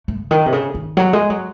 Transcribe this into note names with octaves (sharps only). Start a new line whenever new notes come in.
A3
C#3
D#3
C3
C#3
D#3
F#3
G#3
F#3